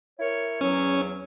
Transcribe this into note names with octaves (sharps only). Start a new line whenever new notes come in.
E4 A#4 C#5
E2 F#3 C#4